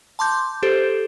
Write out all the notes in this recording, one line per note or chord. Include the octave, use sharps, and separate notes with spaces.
A5 C6 D6 G6
G4 A4 C5